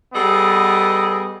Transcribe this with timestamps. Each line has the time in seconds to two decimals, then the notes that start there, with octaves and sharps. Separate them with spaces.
0.14 G3 B3 G#4 A4 D#5